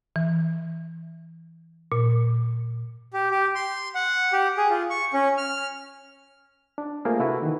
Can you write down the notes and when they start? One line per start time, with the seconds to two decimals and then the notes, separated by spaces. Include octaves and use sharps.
0.16 E3
1.92 A#2
3.13 G4
3.31 G4
3.55 C6
3.95 F#5
4.33 G4
4.57 G#4
4.70 F4
4.90 C#6
5.13 C#4
5.37 F6
6.78 D4
7.05 A3 A#3 F4 G#4 A#4 C5
7.19 C3 E4 F#4 A4 B4
7.42 D#3 E3